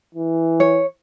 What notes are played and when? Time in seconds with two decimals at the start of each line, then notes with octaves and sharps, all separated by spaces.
0.15 E3
0.60 C#5